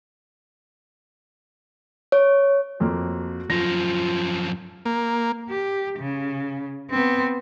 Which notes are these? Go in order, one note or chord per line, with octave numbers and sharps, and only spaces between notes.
C#5
F2 F3 A#3 F#4
F#2 F3 F4 A#6
A#3
G4
C#3
B3 C4